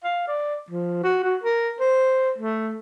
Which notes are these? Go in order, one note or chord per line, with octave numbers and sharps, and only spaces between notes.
F5
D5
F3
F#4
F#4
A#4
C5
A3